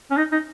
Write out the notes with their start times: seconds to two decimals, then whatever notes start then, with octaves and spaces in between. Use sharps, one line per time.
0.11 C#4
0.17 D#4
0.32 D#4